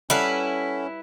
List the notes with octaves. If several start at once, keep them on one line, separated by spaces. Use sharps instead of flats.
G3 C#4 E4 A4 B4 F5 F#5